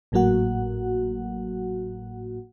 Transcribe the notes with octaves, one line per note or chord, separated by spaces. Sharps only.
G#1 A2 F#3 A#3 F#4 F#5